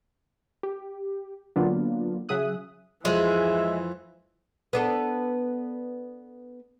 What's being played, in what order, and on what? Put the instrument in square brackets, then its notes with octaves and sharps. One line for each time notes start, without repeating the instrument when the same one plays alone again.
[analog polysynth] G4
D3 F#3 A#3 B3 D4 F4
C#3 F#3 G#4 E5 D#6 F#6
[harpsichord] F2 [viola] E3 [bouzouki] G#3 [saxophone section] E5
[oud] B3 D4 A4